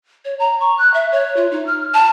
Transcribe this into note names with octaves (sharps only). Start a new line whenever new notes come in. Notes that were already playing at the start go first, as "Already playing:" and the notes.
C#5
A#5
C#6
F#6
E5
C#5
F4
D#4
F6
A5